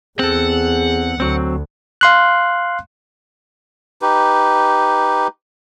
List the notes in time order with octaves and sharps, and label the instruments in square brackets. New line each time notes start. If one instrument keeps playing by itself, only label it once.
[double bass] E2 [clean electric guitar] C4 A4 [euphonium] G#4 [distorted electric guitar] F#5
[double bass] D2 [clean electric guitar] F#3 C4
[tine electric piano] F5 C6 F#6
[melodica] D#4 G4 B4